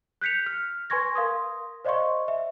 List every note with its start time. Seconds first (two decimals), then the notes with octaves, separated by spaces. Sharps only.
0.21 F#6 G6 B6 C#7 F7
0.46 F6
0.90 B4 G#5 C6 C#6 G#6 A#6
1.15 A#4 F5 C6 D#6
1.85 C5 D5 D#5 F5 C6 C#6
2.28 E5